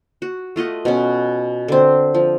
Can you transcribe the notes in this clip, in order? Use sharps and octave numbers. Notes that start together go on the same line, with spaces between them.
F#4
A3 F4 D#5 F#5
B2 C#4
D3 C4
F3